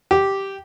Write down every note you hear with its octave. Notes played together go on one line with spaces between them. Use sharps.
G4